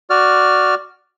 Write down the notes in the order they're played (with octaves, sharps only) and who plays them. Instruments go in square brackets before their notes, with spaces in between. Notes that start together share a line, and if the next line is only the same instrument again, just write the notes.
[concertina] F#4 D5 F6